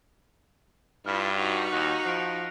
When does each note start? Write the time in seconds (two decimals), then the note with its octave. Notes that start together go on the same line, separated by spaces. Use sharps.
1.06 G2 E4 F4 F6 B6
1.38 D#4 F#4 F7
1.72 D#2 F#6 A#6 C#7
2.05 F3 F#6 C7 D7